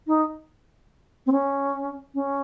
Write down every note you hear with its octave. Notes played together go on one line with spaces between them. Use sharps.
D#4
C4
C#4
C#4